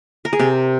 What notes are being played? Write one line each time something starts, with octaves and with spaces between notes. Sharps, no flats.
A#4
G#4
C3 G4